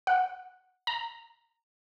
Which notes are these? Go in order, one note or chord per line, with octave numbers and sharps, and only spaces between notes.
F#5
A#5